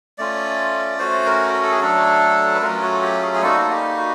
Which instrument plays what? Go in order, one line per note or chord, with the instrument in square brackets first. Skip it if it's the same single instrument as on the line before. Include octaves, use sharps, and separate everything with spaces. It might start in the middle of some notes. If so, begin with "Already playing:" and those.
[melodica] A3 C#4 F4 D5
A3 C#4 F#4 C5
A#4
A#4
A4
G#4
F#3 A3 D4 A4
B4
F#3 A3 C#4 F4 A#4
F#4
G4
G#4
G#4
G3 A#3 D#4 F#4 A4
F#4
G4
F#4